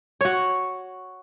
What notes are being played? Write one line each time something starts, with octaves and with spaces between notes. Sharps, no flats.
F#4 C#5